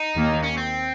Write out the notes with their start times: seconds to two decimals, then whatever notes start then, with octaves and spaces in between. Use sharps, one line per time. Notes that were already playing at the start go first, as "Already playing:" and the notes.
Already playing: D#4
0.15 D#2 D#3 A#3
0.43 C#4
0.57 C4